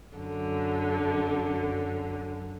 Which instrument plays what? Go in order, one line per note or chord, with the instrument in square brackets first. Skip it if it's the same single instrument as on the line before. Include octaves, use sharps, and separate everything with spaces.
[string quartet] F#2 D3